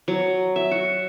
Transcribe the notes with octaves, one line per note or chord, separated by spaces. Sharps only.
F#3
E5
F#4